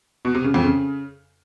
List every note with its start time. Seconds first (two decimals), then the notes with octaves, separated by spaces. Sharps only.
0.25 B2
0.35 C3
0.44 C#3
0.54 F2
0.64 C#3